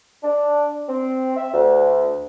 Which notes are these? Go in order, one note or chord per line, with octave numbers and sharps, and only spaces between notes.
D4
C4
E5
D2